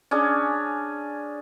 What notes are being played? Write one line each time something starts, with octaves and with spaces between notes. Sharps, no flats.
C#4 D4 G#4